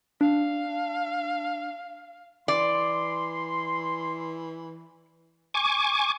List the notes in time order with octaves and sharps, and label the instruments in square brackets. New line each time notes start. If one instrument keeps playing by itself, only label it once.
[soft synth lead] D4 [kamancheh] F5
[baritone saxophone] E3 [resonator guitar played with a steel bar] D5 [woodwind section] C6
[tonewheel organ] G#5 C#6 D6